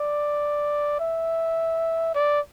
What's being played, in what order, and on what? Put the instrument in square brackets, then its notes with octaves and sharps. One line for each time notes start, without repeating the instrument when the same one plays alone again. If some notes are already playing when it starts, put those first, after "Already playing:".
Already playing: [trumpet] D5
E5
D5